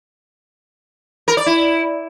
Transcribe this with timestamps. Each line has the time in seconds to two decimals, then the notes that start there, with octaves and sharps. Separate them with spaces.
1.28 A#4
1.37 D5
1.46 E4